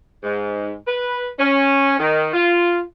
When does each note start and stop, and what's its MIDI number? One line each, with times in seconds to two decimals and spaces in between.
0.23 0.75 44
0.87 1.27 71
1.39 1.95 61
1.99 2.28 51
2.33 2.81 65